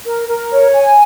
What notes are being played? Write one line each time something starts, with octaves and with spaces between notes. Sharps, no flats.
A#4
A#4
C#5
G#5